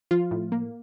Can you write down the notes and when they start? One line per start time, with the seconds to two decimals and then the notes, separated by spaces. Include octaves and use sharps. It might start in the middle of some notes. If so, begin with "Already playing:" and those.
0.11 F3 F4
0.31 A2
0.52 A#3